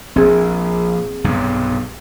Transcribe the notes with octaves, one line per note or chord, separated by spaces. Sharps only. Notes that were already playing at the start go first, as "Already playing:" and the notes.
A#1 C4 G#4
B1 G2 C3